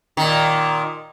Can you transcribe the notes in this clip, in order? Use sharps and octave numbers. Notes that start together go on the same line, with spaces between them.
A#2 D#3